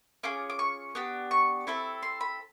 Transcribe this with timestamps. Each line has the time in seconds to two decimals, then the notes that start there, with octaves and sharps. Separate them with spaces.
0.23 C#4 F4 G#4 D6
0.50 D6
0.59 C#6
0.95 B3 D4 G4
1.31 C#6
1.67 C4 E4 A4
2.03 C6
2.21 B5